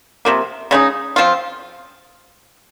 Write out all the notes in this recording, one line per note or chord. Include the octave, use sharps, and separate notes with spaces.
C3 F3 A#3
C#3 G#3 D#4
F3 C4 F4